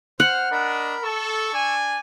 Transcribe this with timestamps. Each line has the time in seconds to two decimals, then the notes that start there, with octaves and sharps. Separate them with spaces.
0.20 C5 F#5 F6
0.52 D4 A#4 D#5 B5
1.03 A4 C#6 E6
1.53 D4 D5 G#5